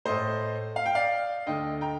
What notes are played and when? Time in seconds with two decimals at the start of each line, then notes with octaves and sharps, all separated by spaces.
0.05 A2 A3 C5 D#5
0.76 F5
0.86 G5
0.95 D5 F5
1.46 D2 D3 A3 D#5 G5
1.81 G5 A#5